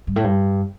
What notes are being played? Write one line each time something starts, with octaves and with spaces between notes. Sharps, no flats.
G2
A2
G2